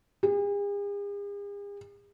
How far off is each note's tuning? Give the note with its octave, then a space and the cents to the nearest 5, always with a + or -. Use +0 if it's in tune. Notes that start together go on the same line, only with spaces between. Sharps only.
G#4 -45